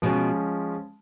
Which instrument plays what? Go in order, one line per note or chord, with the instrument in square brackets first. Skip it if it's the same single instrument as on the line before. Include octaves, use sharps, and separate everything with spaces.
[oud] B2 [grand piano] F3 G#3 C#4